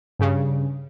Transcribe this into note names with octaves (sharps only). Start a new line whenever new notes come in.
G2 C#3